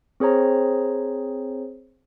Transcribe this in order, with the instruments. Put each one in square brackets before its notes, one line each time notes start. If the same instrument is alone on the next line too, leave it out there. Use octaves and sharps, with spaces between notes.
[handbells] C4 G#4 C5 C#5 A#5